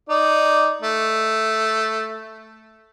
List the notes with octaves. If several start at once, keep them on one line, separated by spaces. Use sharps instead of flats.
D#4 D5
A3